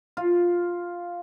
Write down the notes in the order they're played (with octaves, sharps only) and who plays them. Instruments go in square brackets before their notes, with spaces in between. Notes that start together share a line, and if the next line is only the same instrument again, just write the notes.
[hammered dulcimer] F4